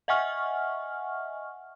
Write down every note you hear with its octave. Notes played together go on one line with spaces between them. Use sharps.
D#5 E5 F#5 G#5 C#6 F6